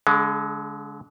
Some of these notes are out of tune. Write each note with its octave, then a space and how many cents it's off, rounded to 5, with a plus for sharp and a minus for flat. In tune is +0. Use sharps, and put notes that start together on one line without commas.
D3 -40 G#3 +10